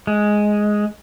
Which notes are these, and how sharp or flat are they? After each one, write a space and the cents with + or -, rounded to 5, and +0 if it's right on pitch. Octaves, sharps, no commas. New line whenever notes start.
G#3 +5